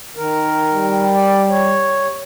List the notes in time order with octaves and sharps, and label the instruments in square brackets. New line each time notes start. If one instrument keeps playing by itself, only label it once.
[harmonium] D#3 A#4
[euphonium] G3
[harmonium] D5
C#5